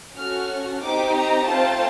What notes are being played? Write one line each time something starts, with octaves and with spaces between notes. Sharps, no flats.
C#4 F#4 A4 F6
C4 D#4 G4 D6
A#5
A3 C4 F4 A5